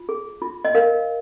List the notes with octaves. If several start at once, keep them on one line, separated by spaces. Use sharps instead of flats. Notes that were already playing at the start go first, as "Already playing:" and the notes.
Already playing: F4
G#4
F4
D#5
A#4 F5